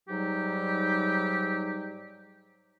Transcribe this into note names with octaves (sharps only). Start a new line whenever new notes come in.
G#2 F#3 G3 D#4 G4